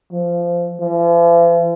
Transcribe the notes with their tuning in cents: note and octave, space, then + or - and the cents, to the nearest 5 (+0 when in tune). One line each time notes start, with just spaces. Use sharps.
F3 -15
F3 -45